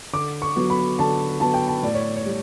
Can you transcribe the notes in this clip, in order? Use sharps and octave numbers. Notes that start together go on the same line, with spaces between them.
D3 D6
C#6
F#3 B3
B5
D3 A5
F#3 B3 A5
G5
A5
A2 D5
C#5
C#5
G3